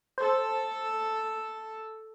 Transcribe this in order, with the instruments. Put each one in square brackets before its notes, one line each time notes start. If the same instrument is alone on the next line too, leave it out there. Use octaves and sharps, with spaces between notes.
[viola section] A4 [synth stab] C5